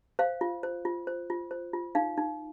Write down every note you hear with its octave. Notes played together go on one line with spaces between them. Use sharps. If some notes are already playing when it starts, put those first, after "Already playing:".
C5 F5
F4
C5
F4
C5
F4
C5
F4
D#4 F5
D#4